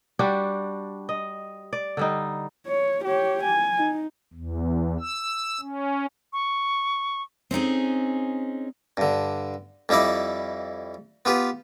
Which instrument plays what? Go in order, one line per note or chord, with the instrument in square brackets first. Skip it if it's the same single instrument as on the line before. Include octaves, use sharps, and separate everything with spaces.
[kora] G3 D4 F#4 G4
D#5
D5
D3 G3 D#4
[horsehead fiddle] C#5
G4 C#5
G#5
D#4
[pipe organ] E2
E6
C#4
[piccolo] C#6
[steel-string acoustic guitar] C4 C#4 D#4 G#4
[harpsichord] G2 D3
F2 G3 D#4 E4 D5
B3 F4 G4 B4